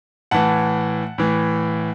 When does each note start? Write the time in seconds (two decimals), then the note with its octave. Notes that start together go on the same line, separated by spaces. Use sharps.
0.31 A2 E3 F#5 A5
1.18 A2 E3